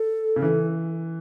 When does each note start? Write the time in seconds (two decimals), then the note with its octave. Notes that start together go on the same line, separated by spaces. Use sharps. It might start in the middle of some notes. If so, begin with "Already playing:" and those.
Already playing: A4
0.36 C#3
0.42 E3